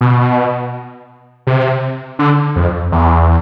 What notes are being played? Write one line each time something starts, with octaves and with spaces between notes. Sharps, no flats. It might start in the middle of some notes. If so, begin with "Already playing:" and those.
B2
C3
D3
F2
E2